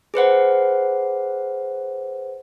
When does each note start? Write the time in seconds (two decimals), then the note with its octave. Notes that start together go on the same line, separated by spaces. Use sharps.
0.14 G#4 B4 C5 F#5